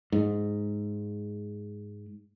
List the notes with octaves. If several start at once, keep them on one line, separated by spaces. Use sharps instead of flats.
G#2